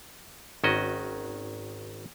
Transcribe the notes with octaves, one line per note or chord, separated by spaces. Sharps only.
G#1 D#3 C#4 F#4 D#5